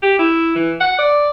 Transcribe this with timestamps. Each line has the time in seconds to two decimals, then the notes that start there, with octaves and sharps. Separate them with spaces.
0.03 G4
0.19 E4
0.56 E3
0.81 F#5
0.99 D5